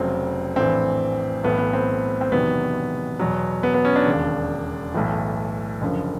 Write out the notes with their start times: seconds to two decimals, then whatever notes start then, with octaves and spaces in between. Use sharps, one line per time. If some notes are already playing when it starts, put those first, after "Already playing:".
Already playing: F1 F2 C#3 F#3 C4
0.56 A#1 A2 E3 C4
1.43 B1 A2 E3 B3
1.58 B3
1.73 C4
2.21 C4
2.31 E1 E2 C3 D#3 F#3 B3
3.19 E2 B2 F#3
3.63 B3
3.74 B3
3.85 C#4
3.96 D4
4.06 E1 D#2 C#3
4.94 B1 A2 E3
5.81 F#1 F#2 D3 F3